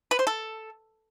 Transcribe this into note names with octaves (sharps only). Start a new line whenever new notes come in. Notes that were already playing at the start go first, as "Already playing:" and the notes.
B4
C5
A4